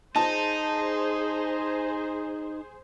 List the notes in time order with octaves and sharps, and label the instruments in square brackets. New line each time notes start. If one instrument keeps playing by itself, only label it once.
[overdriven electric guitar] D#4 [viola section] G#4 C5 [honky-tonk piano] A5